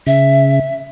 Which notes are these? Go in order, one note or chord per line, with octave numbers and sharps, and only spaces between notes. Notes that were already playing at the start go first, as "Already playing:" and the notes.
C#3 E5